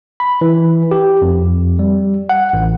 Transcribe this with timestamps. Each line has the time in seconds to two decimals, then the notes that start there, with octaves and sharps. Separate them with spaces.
0.20 B5
0.41 E3
0.91 G4
1.22 F2
1.79 G3
2.29 F#5
2.53 A1